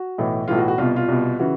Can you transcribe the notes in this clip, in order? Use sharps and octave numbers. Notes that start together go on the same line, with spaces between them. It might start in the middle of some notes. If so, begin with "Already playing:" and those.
Already playing: F#4
B1 A2 E3
B1 A2 E3 F4
F#4
F#4
C2 B2 F4
F4
C2 B2
C#3 E3 F#4